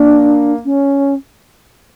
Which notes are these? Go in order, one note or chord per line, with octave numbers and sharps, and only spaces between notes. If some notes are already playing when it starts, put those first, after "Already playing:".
Already playing: A#3 D4
C#4